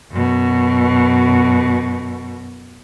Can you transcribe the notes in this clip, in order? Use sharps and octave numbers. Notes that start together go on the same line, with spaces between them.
F#2 B2